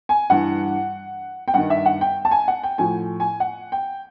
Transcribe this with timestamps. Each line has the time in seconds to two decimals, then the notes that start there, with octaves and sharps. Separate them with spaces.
0.09 G#5
0.30 G2 E3 F#5
1.48 G5
1.54 G2 D#3 F#5
1.70 E5
1.86 F#5
2.01 G5
2.25 A5
2.31 G#5
2.48 F#5
2.63 G5
2.78 A2 F3 G#5
3.20 G#5
3.40 F#5
3.72 G5